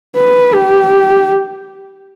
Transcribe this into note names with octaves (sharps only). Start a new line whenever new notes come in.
B4
G4